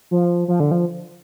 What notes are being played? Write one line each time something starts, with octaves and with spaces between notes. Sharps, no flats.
F3
F3
D3
F3